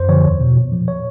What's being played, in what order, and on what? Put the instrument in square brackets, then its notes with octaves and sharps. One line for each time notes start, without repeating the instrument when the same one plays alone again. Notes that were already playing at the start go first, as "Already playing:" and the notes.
Already playing: [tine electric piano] F#2 C5
D3 F3 C#5
E2
B2
A#2
F3
C#5